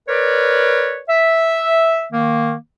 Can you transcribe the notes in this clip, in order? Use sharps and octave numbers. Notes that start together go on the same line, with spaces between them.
A#4 B4 C#5 D5
E5
D#3 A#3